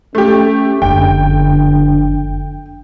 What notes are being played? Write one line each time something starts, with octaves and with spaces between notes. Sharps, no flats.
A3 C#4 G4
F#1 F2 D3 G5